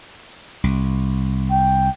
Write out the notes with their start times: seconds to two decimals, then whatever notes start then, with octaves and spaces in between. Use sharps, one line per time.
0.64 C2
1.51 G5